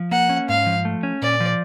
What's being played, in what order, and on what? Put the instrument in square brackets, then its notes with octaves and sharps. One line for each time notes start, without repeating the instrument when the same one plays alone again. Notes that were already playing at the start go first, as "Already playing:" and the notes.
Already playing: [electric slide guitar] F3
[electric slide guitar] A#3 [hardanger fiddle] F#5
[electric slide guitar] C#4
[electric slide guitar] G#2 [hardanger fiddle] F5
[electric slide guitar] F3
A3
C#4
[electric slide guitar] A#2 [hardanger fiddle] D5
[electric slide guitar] F3